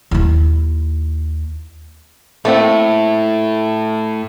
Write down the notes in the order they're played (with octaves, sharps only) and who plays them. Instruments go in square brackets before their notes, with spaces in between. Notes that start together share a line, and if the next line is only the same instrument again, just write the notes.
[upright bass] D#2 E4
[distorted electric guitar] A2 [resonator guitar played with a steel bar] A3 [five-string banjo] A#3 C4 F#5